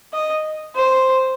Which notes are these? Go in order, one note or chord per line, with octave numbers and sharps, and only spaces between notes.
D#5
C5